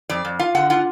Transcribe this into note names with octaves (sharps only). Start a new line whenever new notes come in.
F2 D5
F2
F4 F5
D3 F#5
F4 F#5